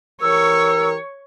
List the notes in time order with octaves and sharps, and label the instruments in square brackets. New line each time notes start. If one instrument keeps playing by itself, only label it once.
[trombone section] E3 G4 A#4 [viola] C#5 C#6 [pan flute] E6